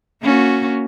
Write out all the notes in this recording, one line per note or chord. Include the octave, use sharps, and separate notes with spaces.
A#3 C#4 F#4